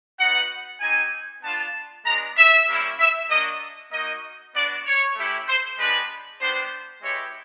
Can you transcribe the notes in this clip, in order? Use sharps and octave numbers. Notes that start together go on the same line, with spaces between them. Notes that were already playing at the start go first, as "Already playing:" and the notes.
B3 D#4 F#4 F#5
C4 D#4 G4 G#5
B3 D4 F4 A5
G#3 B3 D4 A#5
E5
G3 A#3 C#4 E4
E5
A#3 D4 F#4 D#5
A#3 D#4 F#4 D#5
B3 D4 F#4 D5
C#5
A3 C#4 E4 G4
C5
G#3 B3 D4 G4 B4
G3 B3 D4 G4 C5
G#3 B3 E4 G4 C#5